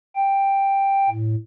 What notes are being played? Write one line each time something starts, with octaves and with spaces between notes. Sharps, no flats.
G5
A2